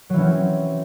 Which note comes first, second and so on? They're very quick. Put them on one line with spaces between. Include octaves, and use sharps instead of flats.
F#3 E3 C#4 C4